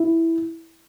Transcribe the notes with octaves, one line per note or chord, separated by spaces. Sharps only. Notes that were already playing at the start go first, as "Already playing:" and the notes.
Already playing: E4